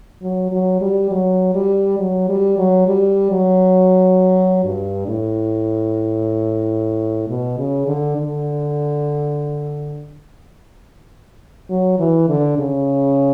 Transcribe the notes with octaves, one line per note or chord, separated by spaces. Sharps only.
F#3
F#3
G3
F#3
G3
F#3
G3
F#3
G3
F#3
G2
A2
B2
C#3
D3
D3
F#3
E3
D3
C#3